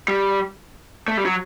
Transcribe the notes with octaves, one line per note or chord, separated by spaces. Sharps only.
G3
A3
G3
F#3